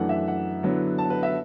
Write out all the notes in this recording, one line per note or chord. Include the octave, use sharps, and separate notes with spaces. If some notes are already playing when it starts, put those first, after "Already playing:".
Already playing: F#2 E3 A3 D4 F#5
E5
F#5
D3 F#3 B3 E4
A5
B4
E5